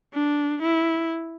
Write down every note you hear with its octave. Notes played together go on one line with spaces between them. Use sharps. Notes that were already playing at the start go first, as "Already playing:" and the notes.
D4
E4